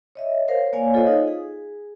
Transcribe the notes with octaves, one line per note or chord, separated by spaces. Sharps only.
C#5 D#5 E5
A#4 C5 C#5 F5
A#3 C#5 D5 F5 G#5
F4 A4 C5 C#5 D#5 F5
D#4 F4
G#4